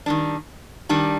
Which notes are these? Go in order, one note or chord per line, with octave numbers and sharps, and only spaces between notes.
D#3 G3 D4
D#3 G3 D4